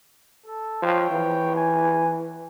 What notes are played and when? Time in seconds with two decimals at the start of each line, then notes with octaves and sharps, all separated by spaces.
0.46 A4
0.82 F3 C#5 G5
1.11 E3
1.55 G#5